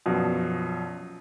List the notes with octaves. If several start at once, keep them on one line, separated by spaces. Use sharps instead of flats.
A#1 F#2 B2 F3